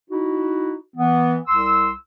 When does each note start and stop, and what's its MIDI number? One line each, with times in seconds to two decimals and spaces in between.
0.10 0.75 63
0.10 0.75 64
0.10 0.75 66
0.96 1.37 52
0.96 1.37 59
1.48 1.91 36
1.48 1.91 84
1.48 1.91 88